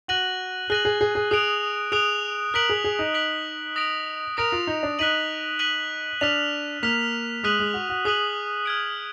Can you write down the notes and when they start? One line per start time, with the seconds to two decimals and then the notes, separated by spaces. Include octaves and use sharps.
0.08 F#4 F#6 A#6 D#7 F#7
0.70 G#4 F#6 A#6 D#7 F#7
0.85 G#4
1.01 G#4
1.15 G#4
1.31 G#4 D#6 F#6 D7 F7
1.92 G#4 D#6 F#6 D7 F7
2.54 A#4 F#6 B6 D7 F#7
2.69 G#4
2.84 G#4
2.99 D#4
3.14 F#6 B6 D7 F#7
3.76 D#6 A#6 D7 F7
4.37 A#4 D#6 A#6 D7 F7
4.52 F4
4.67 D#4
4.83 D4
4.99 D#4 F#6 B6 D#7 F#7
5.59 F#6 B6 D#7 F#7
6.21 D4 F6 B6 F7
6.83 A#3 F6 B6 F7
7.43 G#3 D#6 F#6 B6 D#7 F#7
7.60 G#3
7.74 F#4
7.89 F#4
8.05 G#4 D#6 F#6 B6 D#7 F#7
8.66 F6 G#6 D7